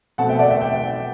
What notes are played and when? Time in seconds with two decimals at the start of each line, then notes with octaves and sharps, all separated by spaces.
0.18 B2 A3 C4 F#5 A5
0.29 E5 G5
0.39 D5 F#5
0.50 E5 G5
0.61 E5 G5